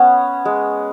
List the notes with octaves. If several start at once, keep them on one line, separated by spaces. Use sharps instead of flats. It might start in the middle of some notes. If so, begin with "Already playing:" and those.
Already playing: B3 C#4
G#3